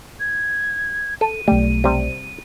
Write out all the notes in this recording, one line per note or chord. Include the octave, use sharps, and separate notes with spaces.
G#6
A4 D#7
B1 G3 A3
C3 G3